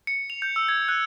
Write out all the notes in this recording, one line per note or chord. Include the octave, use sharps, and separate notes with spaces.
C#7
F7
G6
E6
G#6
F#6